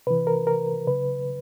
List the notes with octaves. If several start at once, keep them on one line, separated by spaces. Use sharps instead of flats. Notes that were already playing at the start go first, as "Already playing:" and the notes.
C3 E3 B4
A#4
A#4
C#3 F#3 B4